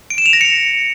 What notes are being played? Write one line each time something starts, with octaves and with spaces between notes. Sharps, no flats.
D7
E7
F7
A#6
C#7